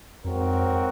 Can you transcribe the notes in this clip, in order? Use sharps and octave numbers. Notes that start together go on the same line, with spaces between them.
F2 G#2 F#3 C4 F#4 A#4